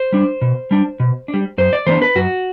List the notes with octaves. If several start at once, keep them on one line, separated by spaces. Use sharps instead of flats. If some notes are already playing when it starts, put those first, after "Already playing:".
Already playing: C5
G3 D4
B2
G3 D4
B2
D4
G3
F#2 C5
D5
E3 B3 D4 C5
B4
F#2 F#4